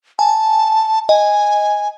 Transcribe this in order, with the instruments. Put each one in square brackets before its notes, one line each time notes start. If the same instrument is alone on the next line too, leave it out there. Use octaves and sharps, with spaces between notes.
[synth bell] G#5 [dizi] A5
[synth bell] D#5 [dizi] G#5